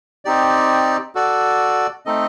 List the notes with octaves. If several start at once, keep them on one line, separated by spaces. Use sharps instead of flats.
C4 D#4 G4 D5
F#4 A4 D5
A3 C4 D#4 A4 D#5